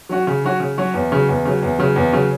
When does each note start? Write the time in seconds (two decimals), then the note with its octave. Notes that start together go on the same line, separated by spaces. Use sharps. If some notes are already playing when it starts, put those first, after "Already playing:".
0.09 F#3 C#4 F#4
0.27 C#3
0.44 F#3 C#4 F#4
0.60 C#3
0.78 F#3 C#4 F#4
0.94 E2
1.12 C#3 F#3
1.29 E2
1.45 C#3 F#3
1.63 E2
1.78 C#3 F#3
1.96 E2
2.13 C#3 F#3